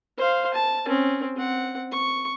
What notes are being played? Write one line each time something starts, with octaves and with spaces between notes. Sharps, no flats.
C5 F5
A5
C4 C#4
C4 F#5
C#6